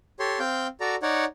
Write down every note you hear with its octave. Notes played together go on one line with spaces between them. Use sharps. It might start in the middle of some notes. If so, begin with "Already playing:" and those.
G4 A4 C#5 C6
C4 F5 G5 G6
F#4 A4 D5 A#5
D#4 C#5 D5 F#5